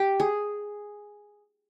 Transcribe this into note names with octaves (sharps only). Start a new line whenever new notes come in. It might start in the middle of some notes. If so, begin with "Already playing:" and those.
Already playing: G4
G#4